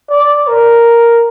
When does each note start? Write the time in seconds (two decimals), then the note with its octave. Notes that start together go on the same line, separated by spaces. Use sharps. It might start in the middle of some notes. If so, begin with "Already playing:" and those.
0.09 D5
0.48 A#4